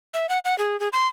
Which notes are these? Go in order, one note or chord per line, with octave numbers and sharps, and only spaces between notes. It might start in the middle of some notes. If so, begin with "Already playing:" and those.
E5
F#5
F#5
G#4
G#4
C6